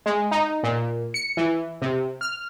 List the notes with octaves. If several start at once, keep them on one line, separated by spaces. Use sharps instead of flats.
G#3
D#4
A#2
C#7
E3
C3
F6